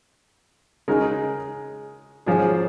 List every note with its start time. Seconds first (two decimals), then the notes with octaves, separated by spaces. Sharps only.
0.88 C#3 G#3 D#4 A#4
2.26 G#2 F3 C#4 G#4